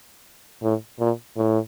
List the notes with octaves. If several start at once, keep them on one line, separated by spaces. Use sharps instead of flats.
A2
A#2
A2